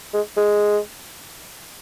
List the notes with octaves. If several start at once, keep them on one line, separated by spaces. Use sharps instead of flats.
G#3
G#3